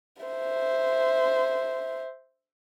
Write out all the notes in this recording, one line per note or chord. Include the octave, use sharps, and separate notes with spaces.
C5 E5